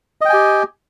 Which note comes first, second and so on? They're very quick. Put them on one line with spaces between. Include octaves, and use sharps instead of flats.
D#5 G5 G#5 G4